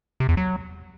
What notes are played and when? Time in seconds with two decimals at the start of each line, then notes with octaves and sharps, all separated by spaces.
0.20 C3
0.29 E2
0.37 F#3